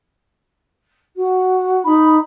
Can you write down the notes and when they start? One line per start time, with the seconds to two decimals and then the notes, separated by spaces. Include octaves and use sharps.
1.16 F#4
1.85 D#4 B5